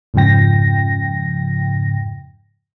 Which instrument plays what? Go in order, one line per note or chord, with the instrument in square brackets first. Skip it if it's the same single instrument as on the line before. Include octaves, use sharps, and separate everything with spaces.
[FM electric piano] F2 G#2 C#3 F3 G5 A#6